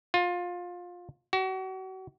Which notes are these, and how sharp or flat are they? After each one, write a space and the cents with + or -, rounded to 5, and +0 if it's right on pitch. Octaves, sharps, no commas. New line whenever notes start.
F4 +20
F#4 +35